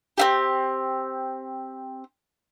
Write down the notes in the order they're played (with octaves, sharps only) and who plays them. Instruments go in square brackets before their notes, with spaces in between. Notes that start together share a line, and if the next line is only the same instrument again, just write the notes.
[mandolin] C4 E4 G4